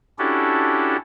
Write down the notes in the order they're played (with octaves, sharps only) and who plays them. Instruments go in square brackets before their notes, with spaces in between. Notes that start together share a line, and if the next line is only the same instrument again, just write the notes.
[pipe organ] C#4 D4 E4 F#4 G4 A4